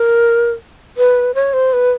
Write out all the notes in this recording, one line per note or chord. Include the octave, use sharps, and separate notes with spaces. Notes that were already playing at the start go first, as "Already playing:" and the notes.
Already playing: A#4
B4
C#5
C5
B4